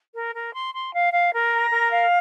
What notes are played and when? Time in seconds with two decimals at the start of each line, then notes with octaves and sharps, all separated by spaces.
0.14 A#4
0.34 A#4
0.53 C6
0.73 C6
0.93 F5
1.12 F5
1.32 A#4
1.51 A#5
1.71 A#4
1.91 F5